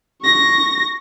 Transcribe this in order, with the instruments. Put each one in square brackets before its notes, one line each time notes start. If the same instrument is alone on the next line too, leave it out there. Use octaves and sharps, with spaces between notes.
[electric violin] C#6 A#6